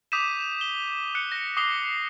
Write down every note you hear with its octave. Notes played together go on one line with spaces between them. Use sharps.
D6 D#6 G6 B6 D#7 E7
G7
F#6 C#7
A#6
D6 D#6 C7 G7